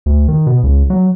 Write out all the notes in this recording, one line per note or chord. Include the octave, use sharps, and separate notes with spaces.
D2
D#3
B2
C#2
F#3